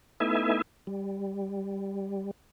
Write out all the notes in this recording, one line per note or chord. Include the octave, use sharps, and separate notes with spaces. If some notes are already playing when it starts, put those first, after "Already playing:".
A3 B3 D#4 E4 E5 G#5
G3